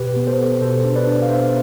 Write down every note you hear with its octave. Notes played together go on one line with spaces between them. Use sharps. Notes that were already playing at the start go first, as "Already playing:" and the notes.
Already playing: B2 G4 B4
B3
A4 C5
B3
B2 A4 C5
D4
B4 D5
D4
F5
B3 C5 E5